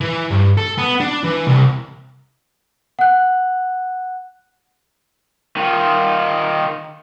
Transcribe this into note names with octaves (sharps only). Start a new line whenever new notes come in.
E3
G2
A4
B3
D4
E3
C2
F#5 F#6
D#3 F4